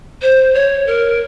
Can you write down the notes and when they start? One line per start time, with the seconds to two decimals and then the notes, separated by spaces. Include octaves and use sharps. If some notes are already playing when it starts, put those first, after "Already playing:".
0.22 C5
0.54 C#5
0.86 A#4